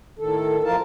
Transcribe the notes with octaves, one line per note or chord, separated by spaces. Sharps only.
A2 D#3 A4
F#2 F3 F4 A#4 A5